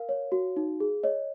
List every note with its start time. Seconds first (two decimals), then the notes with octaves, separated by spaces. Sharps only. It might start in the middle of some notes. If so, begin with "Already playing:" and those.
Already playing: A#4 F5
0.09 C#5
0.32 F#4
0.56 D#4
0.80 G#4
1.03 C#5 D#5